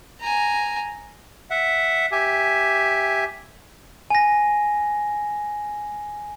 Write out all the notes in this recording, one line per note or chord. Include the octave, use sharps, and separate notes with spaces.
G#5 A#5
E5 F#5
G4 E5 G#5
G#5 A#6